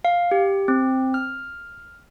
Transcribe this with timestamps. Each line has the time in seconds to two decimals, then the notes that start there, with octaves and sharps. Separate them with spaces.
0.05 F5
0.31 G4
0.68 C4
1.14 F6